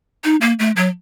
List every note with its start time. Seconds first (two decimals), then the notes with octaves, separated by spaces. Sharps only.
0.24 D#4
0.41 A#3
0.59 A3
0.76 F#3